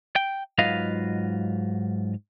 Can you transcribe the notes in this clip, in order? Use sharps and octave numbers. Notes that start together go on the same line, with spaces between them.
G5
G#2 F#3 F4 B4 D#5 F5